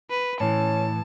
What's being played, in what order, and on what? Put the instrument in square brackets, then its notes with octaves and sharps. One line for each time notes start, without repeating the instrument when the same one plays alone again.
[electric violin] B4
[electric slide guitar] A2 E3 [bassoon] C#4 [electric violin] A5